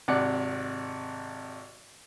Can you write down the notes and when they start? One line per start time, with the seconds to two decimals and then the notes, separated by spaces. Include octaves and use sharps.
0.08 G#1 C3 D5 F#5